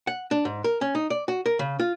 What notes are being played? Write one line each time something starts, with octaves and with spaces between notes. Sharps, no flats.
F#5
D4
G#2
A#4
C#4
D#4
D5
F#4
A#4
C#3
F4